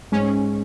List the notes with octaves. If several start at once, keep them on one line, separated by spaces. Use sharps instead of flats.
G#2 C#4